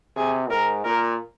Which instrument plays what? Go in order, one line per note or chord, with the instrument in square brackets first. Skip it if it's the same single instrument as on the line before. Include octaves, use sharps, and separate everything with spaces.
[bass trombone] C3 [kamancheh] G#4
[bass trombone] G#2 [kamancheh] A#4
[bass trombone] A#2 [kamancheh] A#4